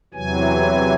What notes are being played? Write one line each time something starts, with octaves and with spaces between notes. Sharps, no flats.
E2 C3 E3 F#3 G#5